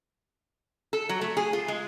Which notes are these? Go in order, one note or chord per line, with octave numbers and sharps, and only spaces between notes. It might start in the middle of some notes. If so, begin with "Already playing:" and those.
A4
F#3
A3
G#4
F4
G#3